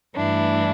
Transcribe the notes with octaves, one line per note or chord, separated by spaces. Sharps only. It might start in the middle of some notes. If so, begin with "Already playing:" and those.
G2 E3 A3 D4 E4